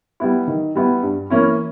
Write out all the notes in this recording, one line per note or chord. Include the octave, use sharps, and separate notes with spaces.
G3 B3 E4
D#3
G3 B3 E4
G2
E3 A#3 C#4 E4